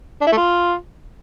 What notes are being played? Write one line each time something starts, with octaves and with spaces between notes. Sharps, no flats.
D4
E4
A3
F4